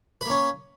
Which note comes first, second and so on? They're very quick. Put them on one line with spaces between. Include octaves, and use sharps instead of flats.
B4 A#3 C#4